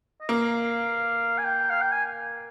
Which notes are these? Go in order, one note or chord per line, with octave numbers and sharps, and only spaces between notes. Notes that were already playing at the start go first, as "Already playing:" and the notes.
D#5
A#3 F5
G#5
G5
F5
G5
G#5